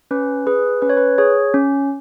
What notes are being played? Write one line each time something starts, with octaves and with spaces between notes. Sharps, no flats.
C#4 B4
G#4 B4
C#4 B4
C#5
B4
G#4 C#5
C#4